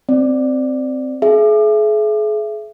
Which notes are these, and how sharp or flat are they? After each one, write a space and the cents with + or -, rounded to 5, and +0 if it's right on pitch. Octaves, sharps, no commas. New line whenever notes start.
C4 -5 D5 +5
G#4 +40 E5 +25